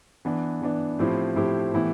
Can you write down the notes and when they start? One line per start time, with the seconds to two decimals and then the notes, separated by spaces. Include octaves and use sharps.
0.25 E3 B3 D4
0.62 E3 B3 D4
0.99 A2 F3 C4 E4 G4
1.36 A2 F3 C4 E4 G4
1.74 A2 E3 B3 E4 G4